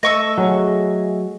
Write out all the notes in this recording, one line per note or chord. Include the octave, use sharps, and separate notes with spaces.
A3 D#5 C#6 E6
F#3 G#4